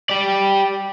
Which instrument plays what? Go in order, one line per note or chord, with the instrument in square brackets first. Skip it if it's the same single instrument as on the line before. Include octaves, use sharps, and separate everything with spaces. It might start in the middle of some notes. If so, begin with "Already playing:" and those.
[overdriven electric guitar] G4 D5